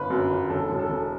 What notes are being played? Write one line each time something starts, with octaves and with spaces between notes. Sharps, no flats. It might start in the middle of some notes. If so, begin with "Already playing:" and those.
Already playing: G1 B4
F#2
G1
E1 A4
E1
A4
E1